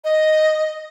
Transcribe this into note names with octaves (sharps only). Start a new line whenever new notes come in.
D#5